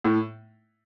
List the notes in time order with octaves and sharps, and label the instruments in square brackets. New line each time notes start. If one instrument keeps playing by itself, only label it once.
[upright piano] A2